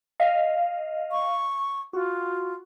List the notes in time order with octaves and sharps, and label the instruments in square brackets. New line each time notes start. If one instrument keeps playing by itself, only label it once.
[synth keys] D#5 F5
[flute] C#6
[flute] F4 [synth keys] F#4